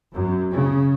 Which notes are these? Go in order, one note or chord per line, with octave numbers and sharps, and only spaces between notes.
F#2
C#3